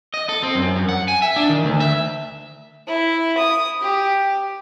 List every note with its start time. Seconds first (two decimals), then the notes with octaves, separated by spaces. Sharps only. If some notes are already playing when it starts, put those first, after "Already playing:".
0.14 D#5
0.29 A4
0.43 C4
0.55 F#2
0.76 F#2
0.89 F#5
1.08 G#5
1.22 E5
1.36 D4
1.50 D#3
1.65 D2
1.80 E5
2.87 E4
3.38 D#6
3.82 G4